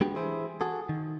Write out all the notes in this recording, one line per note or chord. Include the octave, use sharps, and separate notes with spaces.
G#3 B3 D4 F#4 G4
E3 E4 G#4 C5
F#4 G#4 A4
D#3